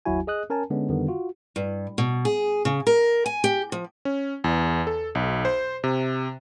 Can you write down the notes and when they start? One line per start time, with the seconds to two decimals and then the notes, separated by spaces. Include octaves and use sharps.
0.06 G1 D#2 F#3 E4 F#4 G#5
0.27 G#4 D#5 D#6 F#6
0.50 C#4 A#4 G#5 A5
0.70 D3 G#3 B3 C#4 D4
0.89 F2 D3 D#3 G3 B3
1.08 F4 F#4
1.56 G2
1.98 B2
2.25 G#4
2.65 C#3
2.87 A#4
3.26 G#5
3.44 G4
3.72 F3
4.05 C#4
4.44 E2
4.87 A4
5.15 B1
5.45 C5
5.84 C3